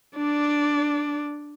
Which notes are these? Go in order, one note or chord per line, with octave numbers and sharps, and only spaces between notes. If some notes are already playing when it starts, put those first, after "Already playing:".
D4 D5